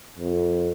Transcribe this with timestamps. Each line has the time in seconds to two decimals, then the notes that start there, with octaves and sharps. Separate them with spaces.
0.18 F2